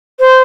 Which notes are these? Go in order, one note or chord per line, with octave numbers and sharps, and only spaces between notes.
C5